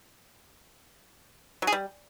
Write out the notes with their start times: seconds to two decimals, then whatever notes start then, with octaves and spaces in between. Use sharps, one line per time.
1.62 F#3
1.67 G#4
1.72 G3